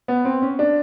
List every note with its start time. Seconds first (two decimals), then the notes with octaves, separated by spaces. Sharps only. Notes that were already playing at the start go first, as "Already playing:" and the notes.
0.08 B3
0.25 C4
0.42 C#4
0.59 D4